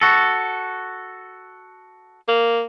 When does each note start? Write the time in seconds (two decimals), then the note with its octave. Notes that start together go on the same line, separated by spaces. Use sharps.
0.01 F#4 A4
2.28 A#3